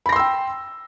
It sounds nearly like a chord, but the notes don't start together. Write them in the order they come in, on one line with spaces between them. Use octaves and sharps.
B5 A#6 C6 E6 G5